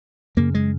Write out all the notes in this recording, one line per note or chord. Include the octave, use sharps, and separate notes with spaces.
F#2 C#3 A#3
G#3